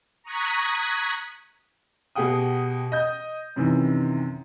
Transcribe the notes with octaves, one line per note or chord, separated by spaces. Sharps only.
A#5 C#6 D#6 F#6 G#6 B6
B2 G4 G#4 F#5 G5 D#6
D#5 D#6 G6
F#2 C3 D#3 E3